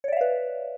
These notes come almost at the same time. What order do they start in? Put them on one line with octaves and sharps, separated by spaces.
C#5 D5 E5 F5 B4